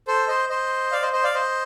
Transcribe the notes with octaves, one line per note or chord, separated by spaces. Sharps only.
A4 C5
C5 D#5
C5 D#5
D5 F5
C5 D#5
C5 D#5
D5 F5
C5 D#5